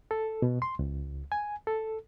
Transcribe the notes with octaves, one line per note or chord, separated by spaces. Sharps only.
A4
B2
C6
C#2
G#5
A4